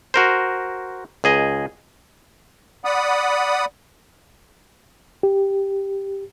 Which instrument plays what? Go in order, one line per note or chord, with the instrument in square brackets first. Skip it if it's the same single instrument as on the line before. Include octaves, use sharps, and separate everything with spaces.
[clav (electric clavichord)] F#4 A#4 C5
C#2 G#4 D#5
[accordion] D5 F#5 B5 D#6
[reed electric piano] G4